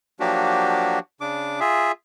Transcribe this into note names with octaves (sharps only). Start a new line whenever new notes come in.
F3 F#3 A#3 D4 F#4 G4
C#3 D4 D6
F4 G#4 E5